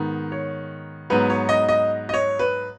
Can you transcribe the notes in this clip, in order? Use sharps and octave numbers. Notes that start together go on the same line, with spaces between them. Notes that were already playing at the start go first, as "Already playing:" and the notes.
Already playing: G#2 D#3 B3
C#5
G#2 F#3 B3 B4
C#5
D#5
D#5
D#5
C#5
B4